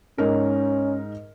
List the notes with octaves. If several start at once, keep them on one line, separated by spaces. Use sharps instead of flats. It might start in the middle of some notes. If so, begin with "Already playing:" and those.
G#2 C#4 D#4 A#4